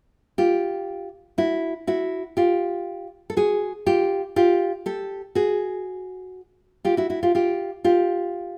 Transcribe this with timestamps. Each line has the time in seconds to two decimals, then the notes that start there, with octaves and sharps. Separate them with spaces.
0.38 F4 G4
1.38 E4 F#4
1.87 E4 F#4
2.37 F4 G4
3.30 A4
3.37 F#4 G#4
3.86 F4 G4
4.36 F4 G4
4.86 G4 A4
5.35 F#4 G#4
6.85 F4 G4
6.97 E4 F#4
7.10 E4 F#4
7.23 F4 G4
7.35 F4 G4
7.84 F4 G4